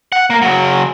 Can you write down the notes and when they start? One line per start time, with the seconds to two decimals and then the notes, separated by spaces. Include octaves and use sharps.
0.12 F#5
0.30 A#3
0.42 C#3 F#3